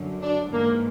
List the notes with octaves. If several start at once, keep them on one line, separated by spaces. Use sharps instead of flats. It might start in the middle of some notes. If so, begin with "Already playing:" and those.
Already playing: F#2 D3
D4
G#2 E3 A#3